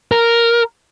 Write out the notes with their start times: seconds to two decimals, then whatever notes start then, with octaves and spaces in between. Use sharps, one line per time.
0.12 A#4